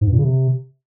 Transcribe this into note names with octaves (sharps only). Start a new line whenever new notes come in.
G#2
G2
A#2
C#3
C3